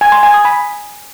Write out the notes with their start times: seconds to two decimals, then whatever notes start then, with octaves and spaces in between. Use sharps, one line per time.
0.01 G#5
0.12 C6
0.23 G#5
0.34 D#6
0.45 B5